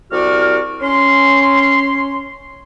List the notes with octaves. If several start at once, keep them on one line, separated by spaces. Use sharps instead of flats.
C2 F#4 D5 F6
C#4 C6